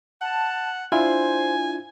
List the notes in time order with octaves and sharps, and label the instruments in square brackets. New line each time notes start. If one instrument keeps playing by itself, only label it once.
[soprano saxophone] F#5 [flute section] A5
[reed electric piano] D4 E4 F4 [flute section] C5 [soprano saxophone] G#5